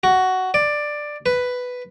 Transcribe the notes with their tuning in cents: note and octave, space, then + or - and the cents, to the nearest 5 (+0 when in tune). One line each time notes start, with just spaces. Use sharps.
F#4 +10
D5 +10
B4 +5